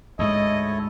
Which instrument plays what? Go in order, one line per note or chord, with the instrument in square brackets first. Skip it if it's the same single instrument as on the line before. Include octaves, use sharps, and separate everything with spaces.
[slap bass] D2 G#2 G#3 [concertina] E4 A4 C#5 [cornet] D#5